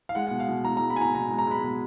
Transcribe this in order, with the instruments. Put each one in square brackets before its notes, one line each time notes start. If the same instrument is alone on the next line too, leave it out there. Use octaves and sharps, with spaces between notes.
[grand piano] F5
G#3 F#5
B2 F#5
F5
B2
G#3 A#5
G#3 A#5
B5
B2 G#5 A#5
B2 A#5
G#3
A#5
G#3 B5
B2